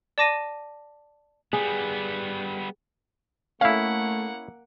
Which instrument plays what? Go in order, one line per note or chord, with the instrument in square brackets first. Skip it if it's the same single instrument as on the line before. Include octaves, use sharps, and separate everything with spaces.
[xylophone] D5 A5 D6 A#6 D#7
[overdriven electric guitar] G3 B3 [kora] G#4
[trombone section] A3 [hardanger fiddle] A#3 F#5 [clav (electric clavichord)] C#4 E4 [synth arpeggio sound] F5